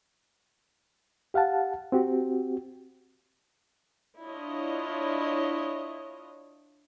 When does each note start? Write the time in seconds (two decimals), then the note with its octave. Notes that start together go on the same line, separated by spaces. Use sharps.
1.34 G4 F5 F#5 A5
1.92 C4 F#4 G4
4.19 D4 E4 F4 C#5 D#5